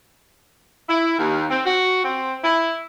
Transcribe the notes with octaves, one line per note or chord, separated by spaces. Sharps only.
E4
D#2
C4
F#4
C4
E4